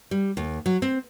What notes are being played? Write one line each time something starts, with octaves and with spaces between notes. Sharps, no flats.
G3
D#2
F#3
C4